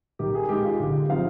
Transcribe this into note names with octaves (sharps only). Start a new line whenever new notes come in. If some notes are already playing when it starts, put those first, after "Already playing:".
D#3 G4
G#4
G#3 D#4 G4
F4
D3 G4
F3 C4 D#4 F5